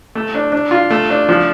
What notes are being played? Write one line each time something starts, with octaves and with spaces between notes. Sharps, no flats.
A3
D4
D4
F4
A3
D4
F3